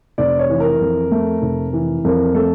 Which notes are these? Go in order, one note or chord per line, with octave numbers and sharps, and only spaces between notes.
F1 D5
C#5
E3
A#4
F2
A3
F1
E3
F2 A#4
A3 A4